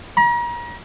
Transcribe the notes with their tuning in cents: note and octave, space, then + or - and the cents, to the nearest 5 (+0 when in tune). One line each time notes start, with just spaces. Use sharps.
A#5 +40